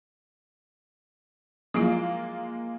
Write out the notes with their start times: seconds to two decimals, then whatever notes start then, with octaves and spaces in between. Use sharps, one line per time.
1.74 F3 F#3 G#3 A#3 E4 F4